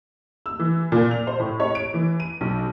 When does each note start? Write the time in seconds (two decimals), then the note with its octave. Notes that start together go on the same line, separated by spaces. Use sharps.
0.46 E6
0.59 E3
0.92 A#2
1.11 F7
1.27 C5
1.40 A2
1.60 C#5
1.75 D7
1.94 E3
2.20 D#7
2.41 B1